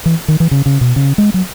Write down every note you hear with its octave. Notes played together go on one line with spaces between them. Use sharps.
E3
D#3
E3
C#3
C#3
B2
C#3
G#3
F#3